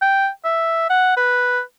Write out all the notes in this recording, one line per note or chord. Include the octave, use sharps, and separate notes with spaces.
G5
E5
F#5
B4